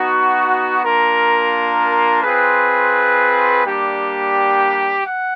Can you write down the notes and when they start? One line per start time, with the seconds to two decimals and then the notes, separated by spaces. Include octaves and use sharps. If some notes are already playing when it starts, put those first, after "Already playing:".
Already playing: B3 D#4 F#4
0.84 A#3 D4 F4 A#4
2.23 C4 F4 G#4 B4
3.64 G3 A#3 D4 G4
5.05 F#5